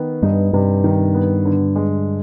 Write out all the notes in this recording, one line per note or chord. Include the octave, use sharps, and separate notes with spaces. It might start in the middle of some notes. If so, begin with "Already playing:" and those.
Already playing: D#3 B3
G2 D#4
G2 C3
D#3
B3
D3
G#3